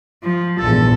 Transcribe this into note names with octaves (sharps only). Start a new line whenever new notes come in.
F3
A#1 E2 G#2 A4